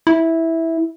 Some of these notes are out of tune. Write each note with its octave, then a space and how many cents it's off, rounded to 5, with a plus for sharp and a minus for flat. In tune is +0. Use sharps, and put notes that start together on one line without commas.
E4 -10